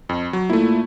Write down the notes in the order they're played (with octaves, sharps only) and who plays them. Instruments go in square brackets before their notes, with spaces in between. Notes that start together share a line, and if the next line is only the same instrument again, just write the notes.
[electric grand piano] F2
F#3
[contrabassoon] A#2 [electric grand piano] A3 E4